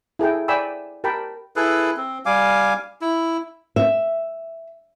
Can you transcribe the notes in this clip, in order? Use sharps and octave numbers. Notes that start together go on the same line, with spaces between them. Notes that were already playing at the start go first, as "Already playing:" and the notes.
E4 G#4 A4 G5
D5 G5 G#5 B5 E6
G4 A#4 G5 A5 B5
E4 G#4 A4 B4
C4
G3 F5 G#5 D6
E4
E5